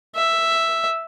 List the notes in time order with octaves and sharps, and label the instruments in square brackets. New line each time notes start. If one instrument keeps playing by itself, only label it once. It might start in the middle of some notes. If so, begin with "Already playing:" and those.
[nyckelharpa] E5